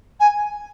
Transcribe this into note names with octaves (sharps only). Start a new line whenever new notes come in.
G#5